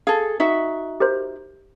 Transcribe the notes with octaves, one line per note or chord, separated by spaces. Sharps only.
G#4 A4 F5
D#4 F#4 E5
G4 A#4 C5